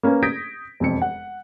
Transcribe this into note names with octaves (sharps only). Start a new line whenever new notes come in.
A#3 C#4 B4
D#6 G6 G#6 A#6 B6 D7
E1 F2 C#7
F#5